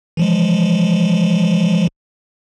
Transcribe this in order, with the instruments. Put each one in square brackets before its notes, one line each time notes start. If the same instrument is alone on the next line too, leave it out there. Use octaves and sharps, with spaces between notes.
[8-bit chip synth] E3 F3 G#3